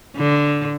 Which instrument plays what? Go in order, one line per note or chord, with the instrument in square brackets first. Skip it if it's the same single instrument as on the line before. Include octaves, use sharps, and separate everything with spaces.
[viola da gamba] D3